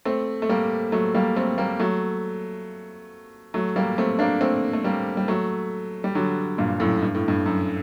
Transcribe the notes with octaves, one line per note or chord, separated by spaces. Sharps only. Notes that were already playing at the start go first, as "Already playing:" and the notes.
A3 C4
A3
G3 A#3
F#3 A3
G3 A#3
A3 C4
G3 A#3
F#3 A3
F#3 A3
G3 A#3
A3 C4
A#3 D4
A3 C4
A3
G3 A#3
G3
F#3 A3
G3
D3 F#3
G2 A#2
F#2 A2
G2
A2
G2
F#2